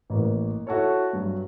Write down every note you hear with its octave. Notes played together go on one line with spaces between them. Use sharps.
A1 A#3
E4 F#4 A4 C#5
G2 F#3